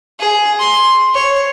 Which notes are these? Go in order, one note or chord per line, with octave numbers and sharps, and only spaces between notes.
G#4
C6
C#5